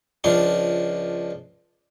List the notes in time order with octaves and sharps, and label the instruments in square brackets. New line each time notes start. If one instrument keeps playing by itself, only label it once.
[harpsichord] C#2 F3 D4